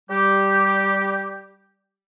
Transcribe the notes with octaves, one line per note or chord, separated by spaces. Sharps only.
G3 G4